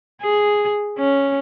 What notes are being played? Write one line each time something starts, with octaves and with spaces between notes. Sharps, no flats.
G#4
C#4